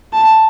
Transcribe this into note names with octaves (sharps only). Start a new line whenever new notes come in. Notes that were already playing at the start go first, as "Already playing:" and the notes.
A5